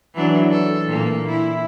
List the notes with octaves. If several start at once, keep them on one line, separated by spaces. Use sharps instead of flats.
E3 F#3 D4
A4
A#2 A#3
E4